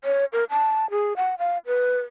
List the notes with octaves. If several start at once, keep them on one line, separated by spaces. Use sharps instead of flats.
C#5
A#4
A5
G#4
F#5
F5
B4